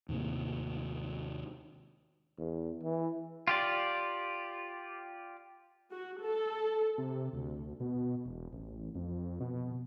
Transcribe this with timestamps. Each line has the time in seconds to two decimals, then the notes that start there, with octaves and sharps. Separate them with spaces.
0.09 D#2 A2 C3 A#3
2.38 E2
2.83 E3
3.48 F4 G4 D5
5.91 F#4
6.23 A4
6.98 C3
7.33 D2
7.80 B2
8.26 E1
8.53 A1
8.95 F2
9.40 B2